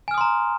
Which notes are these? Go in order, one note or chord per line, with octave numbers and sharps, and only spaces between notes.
G#5 A#5 C6 D#6 F6